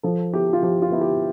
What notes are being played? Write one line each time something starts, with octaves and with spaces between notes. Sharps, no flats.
F3 A4
B3 E4 G4
F4
F3 G4
F4
B3 E4
G4